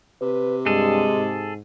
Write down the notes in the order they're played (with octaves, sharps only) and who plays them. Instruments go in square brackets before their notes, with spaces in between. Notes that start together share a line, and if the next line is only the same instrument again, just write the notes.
[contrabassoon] C3 [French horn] B4
[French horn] G2 [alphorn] G#3 [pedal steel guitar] G#4 A4
[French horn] G#2